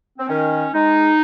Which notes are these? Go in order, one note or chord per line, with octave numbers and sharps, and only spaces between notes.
C4
D#3 C#4
G#3 D#4